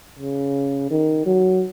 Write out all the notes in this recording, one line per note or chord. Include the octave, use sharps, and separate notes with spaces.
C#3
D#3
F#3